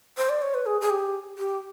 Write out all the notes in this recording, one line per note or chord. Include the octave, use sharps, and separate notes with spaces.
C5
D5
C#5
B4
G#4
G#4
G4
G4